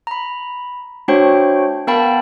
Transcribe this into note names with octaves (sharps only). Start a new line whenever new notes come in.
A#5 B5
A3 D4 F#4 C5 C#5 G5
B3 A#4 F5 G5 A5 B5